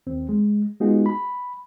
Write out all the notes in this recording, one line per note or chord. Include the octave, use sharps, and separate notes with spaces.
D#2 C4
G#3
G#3 B3 D#4 F4 F#4 G#4
B5